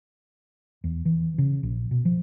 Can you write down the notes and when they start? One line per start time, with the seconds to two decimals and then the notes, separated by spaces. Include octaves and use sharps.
0.84 E2
1.05 E3
1.38 C#3
1.63 A#1
1.91 B2
2.05 F3